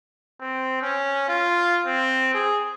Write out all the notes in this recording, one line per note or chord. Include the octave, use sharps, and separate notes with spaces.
C4
C#4
F4
C4
G#4